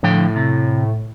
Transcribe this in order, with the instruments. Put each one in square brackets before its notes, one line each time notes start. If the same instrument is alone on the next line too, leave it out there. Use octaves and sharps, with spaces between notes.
[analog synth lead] A2 [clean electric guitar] D3 F3 G5
[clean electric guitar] C3